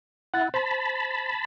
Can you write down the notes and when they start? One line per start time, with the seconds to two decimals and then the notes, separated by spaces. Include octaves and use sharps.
0.34 E4 F#5 F#6 A6
0.54 C5 A5 B5